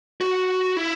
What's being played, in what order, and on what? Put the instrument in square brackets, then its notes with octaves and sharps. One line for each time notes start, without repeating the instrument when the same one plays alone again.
[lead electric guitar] F#4
E4